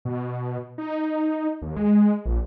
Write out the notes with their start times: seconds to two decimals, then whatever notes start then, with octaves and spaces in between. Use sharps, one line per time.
0.05 B2
0.78 D#4
1.62 D#2
1.76 G#3
2.25 A#1